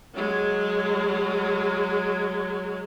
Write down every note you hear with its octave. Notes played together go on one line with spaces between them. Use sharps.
F#3 G#3